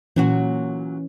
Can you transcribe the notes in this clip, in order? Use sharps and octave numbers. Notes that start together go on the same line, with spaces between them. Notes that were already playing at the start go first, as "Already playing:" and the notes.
A#2 E3 F#3 C#4 F#4